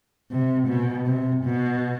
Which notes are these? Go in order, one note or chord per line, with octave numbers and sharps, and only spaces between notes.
C3
B2
C3
B2